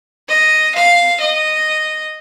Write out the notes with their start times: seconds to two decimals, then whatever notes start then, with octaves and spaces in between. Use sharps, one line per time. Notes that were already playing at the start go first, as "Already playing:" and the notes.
0.29 D#5
0.75 F5
1.20 D#5